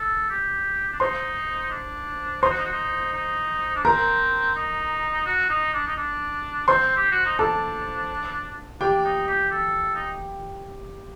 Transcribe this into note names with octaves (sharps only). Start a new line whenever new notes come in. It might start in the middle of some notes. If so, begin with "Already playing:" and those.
Already playing: A4
G4
D4
D#4 C5 C6
D4
D#4 C5 C6
F#4
D#4
F#4
D#4
D#4
D4
C4 A#4 A#5
D#4
F#4
D#4
D4
D#4
D4
C4 C5 C6
G4
F#4
D#4
D4 A4 A5
D4 G4 G5
D#4
G4
A4
D#4